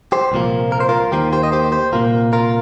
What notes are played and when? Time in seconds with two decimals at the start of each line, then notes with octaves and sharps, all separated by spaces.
0.12 G4 C5
0.32 C2 A#2 F3 A#3
0.72 A#4
0.80 C5
0.89 F4 A#4
1.12 D#2 D#3 A#3 G4 C5
1.32 G4 C5
1.43 D#5
1.52 G4 C5
1.72 G4 C5
1.93 C2 A#2 A#3 F4 A#4
2.33 F4 A#4